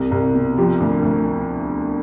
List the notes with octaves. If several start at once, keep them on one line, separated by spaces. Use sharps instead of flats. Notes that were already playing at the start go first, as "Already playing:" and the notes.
Already playing: C2
C2
B2
F3 G4
D2
D2